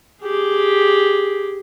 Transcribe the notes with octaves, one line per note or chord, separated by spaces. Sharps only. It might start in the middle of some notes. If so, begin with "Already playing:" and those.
G4 G#4